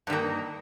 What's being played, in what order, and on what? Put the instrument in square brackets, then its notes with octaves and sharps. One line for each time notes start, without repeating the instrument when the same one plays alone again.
[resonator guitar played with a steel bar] G2
D#3
A#3